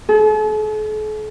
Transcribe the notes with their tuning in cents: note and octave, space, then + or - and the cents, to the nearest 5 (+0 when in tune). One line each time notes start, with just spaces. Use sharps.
A4 -45